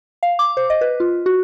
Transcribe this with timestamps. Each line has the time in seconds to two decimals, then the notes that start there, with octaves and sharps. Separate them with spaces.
0.23 F5
0.39 D6
0.57 C5
0.70 D#5
0.81 B4
1.00 F4
1.26 F#4